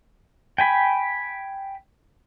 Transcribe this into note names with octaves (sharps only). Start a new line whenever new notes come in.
G5 G#5 B5